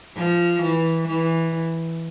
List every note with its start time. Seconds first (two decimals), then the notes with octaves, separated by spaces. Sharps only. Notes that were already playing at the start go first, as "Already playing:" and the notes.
0.16 F3
0.62 E3
1.08 E3